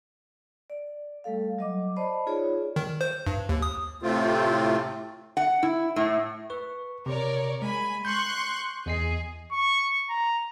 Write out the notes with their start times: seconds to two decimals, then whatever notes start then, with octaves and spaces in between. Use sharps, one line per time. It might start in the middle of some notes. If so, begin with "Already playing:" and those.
0.70 D5
1.24 G3 A3 A4 F5
1.58 F#3 D#5 D6
1.96 C5 D5 D#5 A5 B5
2.26 D#4 F4 G#4 C#5 D5
2.76 D#3
3.01 C5
3.27 G2
3.49 D#2
3.62 D#6
4.02 A2 C3 A3 C4 F4
5.37 F#5
5.63 E4
5.96 A2
6.50 B4 C#6
7.06 C3 A#4 C#5 D5
7.62 G#3 G#5 B5
8.05 C6 C#6 F#6 G6
8.86 E2 G#4 D#5 C7
9.52 C#6
10.10 A#5